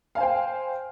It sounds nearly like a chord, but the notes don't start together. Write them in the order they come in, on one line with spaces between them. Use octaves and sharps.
F5 G#5 C5 G5